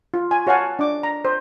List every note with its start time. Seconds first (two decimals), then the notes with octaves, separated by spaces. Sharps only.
0.14 F4
0.31 G#5
0.47 F#4 C#5 F5 F#5 G#5 A5
0.79 D4 D6
1.03 A#5
1.25 C5